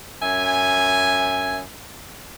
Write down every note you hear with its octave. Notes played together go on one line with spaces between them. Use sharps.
F#2 E5 G#5